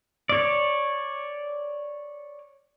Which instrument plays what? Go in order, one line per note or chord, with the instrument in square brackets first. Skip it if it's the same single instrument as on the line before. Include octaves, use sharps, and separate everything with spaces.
[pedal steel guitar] C#5 D5